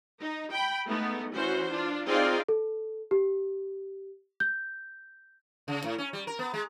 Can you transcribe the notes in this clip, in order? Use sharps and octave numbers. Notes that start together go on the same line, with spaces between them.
D#4
G5 B5
G#3 A3 B3 D#4
E3 C#4 F#4 C5
D4 F4
C4 D#4 F4 G#4 D5 F5
A4
G4
G6
C#3
A2
C#4
G3
A#4
B3
G#3